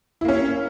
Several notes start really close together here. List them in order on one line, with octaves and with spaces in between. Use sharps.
E4 A#3 C#4